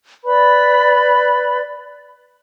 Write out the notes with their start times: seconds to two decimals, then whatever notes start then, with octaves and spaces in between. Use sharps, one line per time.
0.24 B4 D5 B5